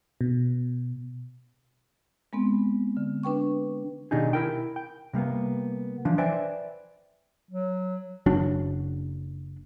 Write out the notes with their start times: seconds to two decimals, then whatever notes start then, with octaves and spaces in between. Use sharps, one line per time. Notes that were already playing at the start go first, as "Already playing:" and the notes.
0.21 B2
2.33 G#3 B3 C4
2.97 D3
3.23 D4 B4 G5 C#6
4.11 B2 D#3 D4 D#4 G4 G#4
4.33 E4 A#4 G5
4.76 G5
5.13 C3 G3 A#3 B3
6.05 E3 F3 D4
6.18 B4 C5 D5 E5 G5 G#5
7.51 F#3
8.26 F#1 F#3 D4